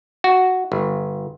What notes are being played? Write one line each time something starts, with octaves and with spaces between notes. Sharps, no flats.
F#4
G1